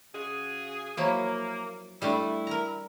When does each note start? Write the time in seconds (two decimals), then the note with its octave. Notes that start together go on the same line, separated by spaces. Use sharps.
0.15 C#3 F#4 G#4
0.97 F3 F#3 A#3 E4
2.02 G3 A3 D4 E4
2.47 A#4 A#5